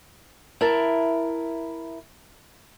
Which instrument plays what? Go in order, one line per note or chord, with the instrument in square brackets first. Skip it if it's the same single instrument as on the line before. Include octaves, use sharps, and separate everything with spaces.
[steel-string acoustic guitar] E4 A#4 A5